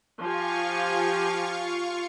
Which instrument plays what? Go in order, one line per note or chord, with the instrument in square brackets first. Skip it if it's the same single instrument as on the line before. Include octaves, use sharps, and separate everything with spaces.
[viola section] F3 G4 G#5 [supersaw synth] F4 F5 C#6